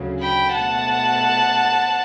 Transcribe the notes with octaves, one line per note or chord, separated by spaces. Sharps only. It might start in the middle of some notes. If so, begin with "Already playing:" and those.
Already playing: D2 C#3 F#3
G5 B5
B2 A3 F#5 A5